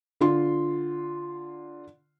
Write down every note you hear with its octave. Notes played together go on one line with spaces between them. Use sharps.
D3 F4 C6